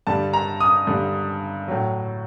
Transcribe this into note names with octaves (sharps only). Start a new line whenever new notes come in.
G2 D3 G3 A5
A#5
D#6
G2 D3 G3
A2 F#3